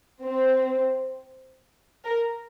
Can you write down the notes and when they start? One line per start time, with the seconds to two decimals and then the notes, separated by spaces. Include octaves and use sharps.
0.23 C4
2.04 A#4